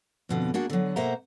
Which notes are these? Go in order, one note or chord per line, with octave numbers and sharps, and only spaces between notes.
F2 B2 D3
A#3 D4 F#4 G#4 D5
D3 F#3
B2 A#3 C5 E5 F#5 A#5